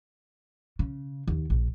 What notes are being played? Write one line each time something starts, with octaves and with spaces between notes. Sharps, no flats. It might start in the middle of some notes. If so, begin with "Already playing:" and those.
C#3
D#2
A#1